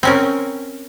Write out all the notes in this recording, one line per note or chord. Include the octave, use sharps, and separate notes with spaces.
C4 C#4 A#4